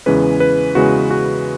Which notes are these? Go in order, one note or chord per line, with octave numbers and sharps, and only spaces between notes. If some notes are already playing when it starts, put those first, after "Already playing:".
E2 C#3 E3 G#3 C#4 B4
B4
E2 C#3 E3 G#3 C#4 F#4
F#4